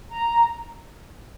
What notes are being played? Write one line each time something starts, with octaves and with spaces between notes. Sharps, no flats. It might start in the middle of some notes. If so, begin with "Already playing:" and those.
A#5